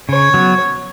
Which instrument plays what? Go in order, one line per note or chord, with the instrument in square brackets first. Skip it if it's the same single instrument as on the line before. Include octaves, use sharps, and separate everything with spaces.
[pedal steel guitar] C#3 [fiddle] C#5
[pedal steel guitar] F#3 B3